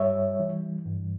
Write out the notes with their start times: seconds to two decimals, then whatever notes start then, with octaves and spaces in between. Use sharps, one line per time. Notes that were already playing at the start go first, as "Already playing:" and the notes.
Already playing: G2 G3 C#5 E5
0.40 E3
0.86 G2